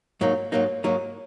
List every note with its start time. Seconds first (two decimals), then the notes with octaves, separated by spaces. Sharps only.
0.21 G#2 F#3 A#3 D#4
0.52 G#2 F#3 A#3 D#4
0.84 G#2 F#3 A#3 D#4